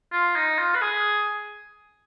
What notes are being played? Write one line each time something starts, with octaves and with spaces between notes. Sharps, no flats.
F4
D#4
F4
B4
G#4